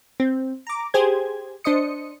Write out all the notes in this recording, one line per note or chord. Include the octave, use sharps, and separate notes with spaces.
C4
A#5 D6
G4 G#4 C5 G#6
D4 C5 D#5 D#6 C#7